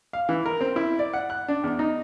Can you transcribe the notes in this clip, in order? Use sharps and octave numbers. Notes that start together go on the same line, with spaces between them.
F5
E3
A#4
C4
E4
D5
F#5
F#6
D4
E2
D#4